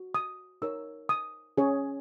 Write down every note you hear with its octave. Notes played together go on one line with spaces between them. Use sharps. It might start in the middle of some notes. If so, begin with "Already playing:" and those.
Already playing: F#4
D#6
D#4 A#4 C#5 E6
D#6
C#4 G#4 C#5